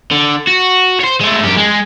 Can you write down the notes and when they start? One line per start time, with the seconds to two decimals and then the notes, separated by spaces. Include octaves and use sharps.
0.11 D3
0.47 F#4
1.01 C5 C#5
1.21 G#3 A3
1.43 F#2 G4
1.57 G#3